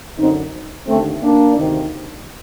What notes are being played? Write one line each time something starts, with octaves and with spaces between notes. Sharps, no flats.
F#2 D3 C4 D#4
D#2 D3 A3 C4
A#3 D4
D2 C3 D#3